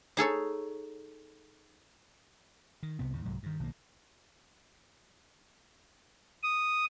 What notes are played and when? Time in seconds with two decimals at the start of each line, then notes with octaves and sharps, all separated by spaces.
0.17 D#4 G#4 A4 C#5
2.83 D#3
2.99 C2 C3 B3
3.13 D#2 A2 C#3
3.25 C2 G#2 F#3 G#3
3.43 G2 D#3
3.60 B1 D#3 E3 A#3
6.43 D#6